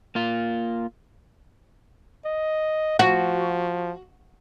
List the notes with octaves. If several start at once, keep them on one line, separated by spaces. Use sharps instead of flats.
A#3 F4
D#5
F3 F#4